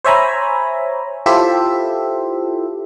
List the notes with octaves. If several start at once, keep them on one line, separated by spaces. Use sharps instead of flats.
C5 C#5 E5 G#5 A#5 B5
E4 F4 G4 A4 C5 E5